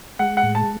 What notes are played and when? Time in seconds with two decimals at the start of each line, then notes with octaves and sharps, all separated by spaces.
0.19 G#3 F#5
0.37 F#5
0.43 A2
0.55 A5